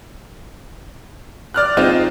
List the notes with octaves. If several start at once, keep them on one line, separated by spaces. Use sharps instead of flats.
D5 F6 F#6
G#3 C4 D#4 F4